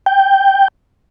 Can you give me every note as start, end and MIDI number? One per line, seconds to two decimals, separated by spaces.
0.06 0.68 79